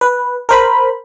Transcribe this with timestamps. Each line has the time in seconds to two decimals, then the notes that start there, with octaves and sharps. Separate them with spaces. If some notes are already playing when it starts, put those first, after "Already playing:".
0.01 B4
0.49 A#4 C5 B5